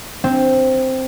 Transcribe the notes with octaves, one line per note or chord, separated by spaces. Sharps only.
C4